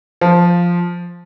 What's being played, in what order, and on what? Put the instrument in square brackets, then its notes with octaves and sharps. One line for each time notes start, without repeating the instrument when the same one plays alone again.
[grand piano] F3